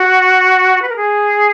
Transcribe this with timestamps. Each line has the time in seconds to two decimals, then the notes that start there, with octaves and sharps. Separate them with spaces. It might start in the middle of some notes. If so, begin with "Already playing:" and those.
Already playing: F#4
0.82 B4
0.89 A#4
0.96 G#4